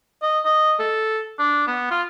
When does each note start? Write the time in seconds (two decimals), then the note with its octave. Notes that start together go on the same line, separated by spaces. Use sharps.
0.23 D#5
0.45 D#5
0.80 A4
1.39 D4
1.67 B3
1.91 F4